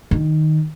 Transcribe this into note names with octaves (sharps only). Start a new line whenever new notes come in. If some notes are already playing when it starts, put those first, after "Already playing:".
D#3